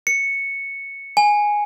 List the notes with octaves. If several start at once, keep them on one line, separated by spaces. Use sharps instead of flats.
C#7
G#5